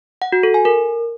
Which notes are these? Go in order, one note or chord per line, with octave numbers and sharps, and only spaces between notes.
F#5
F#4
A4
G#5
A#4